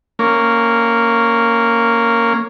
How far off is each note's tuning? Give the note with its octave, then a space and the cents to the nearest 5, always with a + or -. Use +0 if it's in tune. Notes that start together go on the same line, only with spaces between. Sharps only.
A#3 -10 C#4 +0